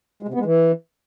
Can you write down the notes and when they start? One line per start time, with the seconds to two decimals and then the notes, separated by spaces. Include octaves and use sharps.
0.22 G#3
0.28 C3
0.34 B3
0.40 G#3
0.45 E3